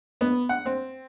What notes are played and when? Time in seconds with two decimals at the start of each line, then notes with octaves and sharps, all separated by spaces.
0.21 B3
0.49 F#5
0.66 C4